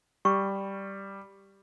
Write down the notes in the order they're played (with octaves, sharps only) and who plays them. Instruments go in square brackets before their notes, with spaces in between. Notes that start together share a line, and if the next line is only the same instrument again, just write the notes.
[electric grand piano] G3 [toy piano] C#6